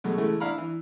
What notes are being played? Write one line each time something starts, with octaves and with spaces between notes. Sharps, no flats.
B2 F#3 G#3 A3
C#3 E3 G#3 A3
D4 E4 F5 A#5 B5
E3